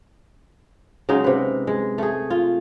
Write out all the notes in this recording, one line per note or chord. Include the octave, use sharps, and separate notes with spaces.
C#3 F#3 G#3 D#4
C3 B4
G#3
A3 G#4
F4